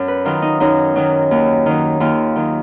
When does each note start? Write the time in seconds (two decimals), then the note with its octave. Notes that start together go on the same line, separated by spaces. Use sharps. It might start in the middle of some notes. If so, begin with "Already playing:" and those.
Already playing: F#2
0.08 B4
0.25 D#3 F#3 F4
0.42 D#4
0.60 F#2 D#4
0.96 D#3 F#3
1.31 D#2
1.66 D#3 F#3
2.00 D#2 F4
2.36 D#3 F#3